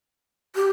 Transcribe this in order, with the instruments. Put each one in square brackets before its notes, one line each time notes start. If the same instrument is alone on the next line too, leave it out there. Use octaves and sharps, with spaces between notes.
[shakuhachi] G4